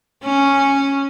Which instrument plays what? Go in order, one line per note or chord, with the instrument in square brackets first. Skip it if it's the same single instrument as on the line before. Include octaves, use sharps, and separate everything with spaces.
[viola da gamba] C#4